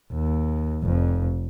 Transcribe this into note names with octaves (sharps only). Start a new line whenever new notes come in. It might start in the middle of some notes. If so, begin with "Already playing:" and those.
D#2
F1 F2